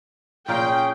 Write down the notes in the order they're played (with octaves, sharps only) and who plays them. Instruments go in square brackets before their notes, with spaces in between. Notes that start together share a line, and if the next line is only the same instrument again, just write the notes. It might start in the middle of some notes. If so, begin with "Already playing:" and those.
[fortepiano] A#2 F5 A#5 [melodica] C#4 G#4 [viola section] G5